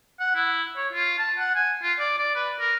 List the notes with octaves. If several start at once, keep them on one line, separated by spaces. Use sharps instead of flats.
F#5
E4
C#5
F4
A5
F#5
G#5
F4
D5
D5
B4
A#4